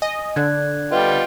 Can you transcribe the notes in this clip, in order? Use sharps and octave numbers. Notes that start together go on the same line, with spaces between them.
D#5 G#5
D3 D5 F#6 G#6
G3 B3 F4 D#5 G5